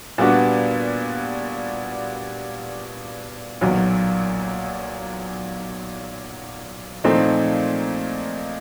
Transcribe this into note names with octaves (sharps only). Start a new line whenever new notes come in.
A#2 G3 B3 D4 F#4
B1 A#2 F#3
A#2 F3 A3 C4 D#4